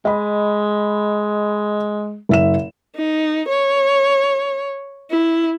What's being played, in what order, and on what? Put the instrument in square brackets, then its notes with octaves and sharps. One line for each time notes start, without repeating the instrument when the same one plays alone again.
[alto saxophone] G#3 [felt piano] D#5 B5
[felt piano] F#1 E5 E7
[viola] D#4
C#5
E4